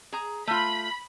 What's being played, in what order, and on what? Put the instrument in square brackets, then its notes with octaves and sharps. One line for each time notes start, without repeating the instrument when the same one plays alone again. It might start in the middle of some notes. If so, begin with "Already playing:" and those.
[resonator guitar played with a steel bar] G#4 A#5
[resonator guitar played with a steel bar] A3 F4 [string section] B5